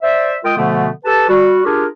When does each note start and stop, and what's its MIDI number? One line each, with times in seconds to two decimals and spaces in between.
0.03 0.36 72
0.03 0.36 74
0.03 0.36 76
0.45 0.52 56
0.45 0.52 65
0.45 0.52 70
0.45 0.52 79
0.45 0.52 87
0.57 0.89 47
0.57 0.89 50
0.57 0.89 53
0.57 0.89 57
0.57 0.89 59
1.05 1.27 67
1.05 1.27 69
1.05 1.27 71
1.05 1.27 81
1.29 1.64 55
1.29 1.64 66
1.65 1.86 62
1.65 1.86 65
1.65 1.86 67
1.65 1.86 68
1.65 1.86 70